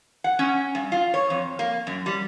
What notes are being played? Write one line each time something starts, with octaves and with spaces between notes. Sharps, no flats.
F#5
C#4
G2
F4
C#5
F2
A#3
F#2
G3